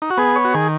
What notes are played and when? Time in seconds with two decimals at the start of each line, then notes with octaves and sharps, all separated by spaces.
0.02 D#4
0.10 F#4
0.17 B3 G#4
0.36 C#5
0.45 F#4
0.54 D#3 G#4